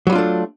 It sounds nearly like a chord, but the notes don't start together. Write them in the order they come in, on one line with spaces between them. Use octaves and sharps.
F#3 G3 F4 D4 A3